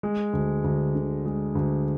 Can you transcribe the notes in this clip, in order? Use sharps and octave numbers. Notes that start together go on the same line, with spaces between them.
G#3
D2
D2
D3
G#3
D2